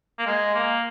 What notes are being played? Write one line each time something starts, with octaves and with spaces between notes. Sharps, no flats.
A#3
G#3
A#3